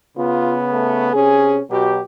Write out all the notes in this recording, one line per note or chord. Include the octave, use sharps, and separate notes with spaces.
C#3 B3 F4
A3
C3 C#4 G#4
B2 F#3 G4